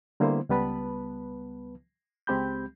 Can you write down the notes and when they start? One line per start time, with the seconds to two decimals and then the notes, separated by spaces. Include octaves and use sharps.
0.20 D3 G3 A#3 B3 E4 C5
0.49 C#2 G3 B3 B4 A5 B5
2.27 C#2 G#3 C4 G4 B5 G6